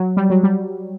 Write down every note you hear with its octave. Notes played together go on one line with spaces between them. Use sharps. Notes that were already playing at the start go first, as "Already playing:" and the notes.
Already playing: F#3
G3
F#3
G3